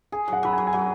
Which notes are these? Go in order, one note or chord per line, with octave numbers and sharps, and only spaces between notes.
G#4 G#5
F#3 F#5
F#3 B5
G#5
F#3
G#5
F#3 F#5